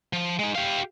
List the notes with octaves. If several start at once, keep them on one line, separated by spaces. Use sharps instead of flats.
F3
G#3 D#4
G4 F5